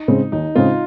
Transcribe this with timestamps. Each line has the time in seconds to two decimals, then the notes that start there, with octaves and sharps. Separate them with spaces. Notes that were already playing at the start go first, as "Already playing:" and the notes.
Already playing: D#4
0.08 C#3 G#3 C4
0.32 D#2 D#4
0.55 C#3 G#3 C4 F4